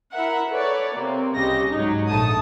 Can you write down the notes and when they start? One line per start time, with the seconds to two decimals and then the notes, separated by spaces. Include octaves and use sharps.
0.13 E4 A#4 E5 F#5
0.50 A4 B4 C#5 D5
0.94 C3 A#3 C4
1.36 C2 C#3 G3 G4 D#5 A#6
1.71 G#2 F#3 D#4
2.09 A#1 A3 A5 D#6